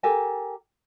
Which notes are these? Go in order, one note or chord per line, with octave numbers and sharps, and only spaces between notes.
G4 A4 A#4 G#5